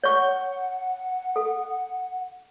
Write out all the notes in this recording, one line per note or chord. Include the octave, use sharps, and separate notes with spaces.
C#5 F#5 C#6
A4